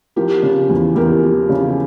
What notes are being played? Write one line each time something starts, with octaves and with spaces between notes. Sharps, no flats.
F3 G4 A#4
C#3
E2
E2 G4 A#4
F3
C#3